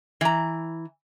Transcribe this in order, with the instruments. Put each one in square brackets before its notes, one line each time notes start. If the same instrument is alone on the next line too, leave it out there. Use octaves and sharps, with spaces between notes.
[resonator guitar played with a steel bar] E3 A#5